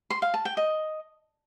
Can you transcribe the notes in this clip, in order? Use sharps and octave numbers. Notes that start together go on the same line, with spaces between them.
C6
F5
A5
G5
D#5